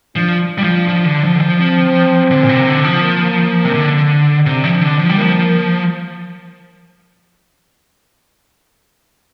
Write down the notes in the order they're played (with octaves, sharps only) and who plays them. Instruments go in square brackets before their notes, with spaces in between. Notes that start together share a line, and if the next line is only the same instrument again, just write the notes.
[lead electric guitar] F3 [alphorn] D4
[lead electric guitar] G3
F3
F3
D3
F3
D3
F3
[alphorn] C4
[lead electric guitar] D3
A#2
C3
D3
F3
[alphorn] A#3
[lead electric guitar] C3
[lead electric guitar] D3 [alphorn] D4
[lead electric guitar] C3
F3
D3
F3
G3
[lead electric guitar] F3 [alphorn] A#3